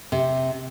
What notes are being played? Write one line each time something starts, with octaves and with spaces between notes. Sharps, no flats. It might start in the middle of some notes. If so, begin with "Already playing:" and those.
C3